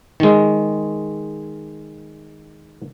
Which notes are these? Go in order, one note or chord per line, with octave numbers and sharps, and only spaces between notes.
D#3 G#3